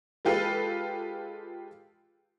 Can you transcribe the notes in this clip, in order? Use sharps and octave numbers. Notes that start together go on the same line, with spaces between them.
G#3 F4 G4 A4 B4 F5